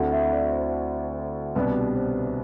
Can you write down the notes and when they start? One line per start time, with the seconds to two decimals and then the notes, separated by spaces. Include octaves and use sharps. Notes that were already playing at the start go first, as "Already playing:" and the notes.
Already playing: D2 D3 A3 C4 E4 F#5
0.12 E5
0.33 D5
0.52 C5
1.55 C2 B2 G3 B3 D4 B4
1.96 C5